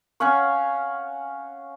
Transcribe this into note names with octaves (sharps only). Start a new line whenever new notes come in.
C#4 F5 F#5 C#6